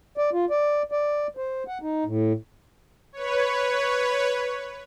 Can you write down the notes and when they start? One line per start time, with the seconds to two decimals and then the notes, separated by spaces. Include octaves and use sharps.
0.17 D5
0.33 F4
0.50 D5
0.92 D5
1.37 C5
1.68 F#5
1.82 D#4
2.05 A2
3.13 B4 C#5